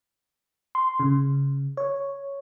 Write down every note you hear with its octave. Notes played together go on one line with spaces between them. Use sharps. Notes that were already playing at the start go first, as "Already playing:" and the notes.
C6
C#3
C#5